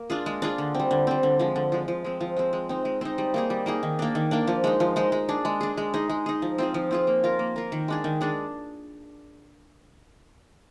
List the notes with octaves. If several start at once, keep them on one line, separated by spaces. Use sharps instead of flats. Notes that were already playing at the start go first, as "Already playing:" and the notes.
Already playing: A#3
D4 F4 G#4
G#3
D4 F4 G#4
D3
G3 C4
D3
G3 C4
D3
F3 G#3
D3
F3 G#3
F3
G#3 C4
F3
G#3 C4
G#3
C4 D#4
G#3
C4 D#4
G3
A#3 D#4 G#4
G3
A#3 D#4 G#4
D#3
A#3 D4
D#3
A#3 D4
F3
G#3 D#4
F3
G#3 D#4
G#3
D4 G#4
G#3
D4 G#4
G#3
D#4 G#4
G#3
D#4 G#4
F3
C4 F4 G#4
F3
C4 F4 G#4
A#3
F4 A#4
A#3
F4 A#4
D#3
G#3 D4 G#4
D#3
G#3 D4 G#4